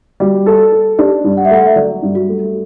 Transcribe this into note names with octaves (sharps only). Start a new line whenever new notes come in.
G3 F#4
A4
A4
D4 G4
G2
F#5
E5
A3 F#5
E5
F#3 D5
G2
F#4
A3